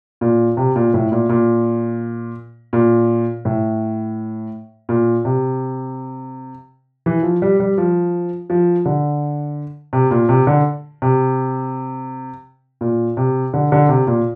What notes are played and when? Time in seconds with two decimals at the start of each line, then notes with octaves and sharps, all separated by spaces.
0.21 A#2
0.57 C3
0.76 A#2
0.94 A2
1.12 A#2
1.29 A#2
2.73 A#2
3.45 A2
4.89 A#2
5.25 C3
7.06 E3
7.23 F3
7.42 G3
7.60 G3
7.78 F3
8.50 F3
8.85 D3
9.93 C3
10.11 A#2
10.29 C3
10.47 D3
11.02 C3
12.81 A#2
13.17 C3
13.54 D3
13.72 D3
13.89 C3
14.07 A#2